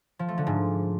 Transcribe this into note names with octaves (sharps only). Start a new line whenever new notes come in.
F3
A3
D3
G#2